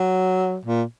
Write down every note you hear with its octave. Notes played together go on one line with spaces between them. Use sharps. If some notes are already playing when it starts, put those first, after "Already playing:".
Already playing: F#3
A#2